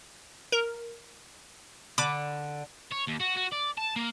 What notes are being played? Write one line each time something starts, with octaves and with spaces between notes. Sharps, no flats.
A#4
D3 B5 D6
C#5
D#2
F#4
F#4
D5
A5
A#3